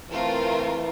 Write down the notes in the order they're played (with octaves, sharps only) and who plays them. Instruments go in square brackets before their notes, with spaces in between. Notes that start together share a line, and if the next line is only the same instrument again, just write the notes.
[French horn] E3 [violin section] A3 C4 F4 A#4